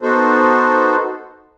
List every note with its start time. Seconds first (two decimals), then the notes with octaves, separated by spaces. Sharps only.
0.02 B3 D#4 F#4 A4 C5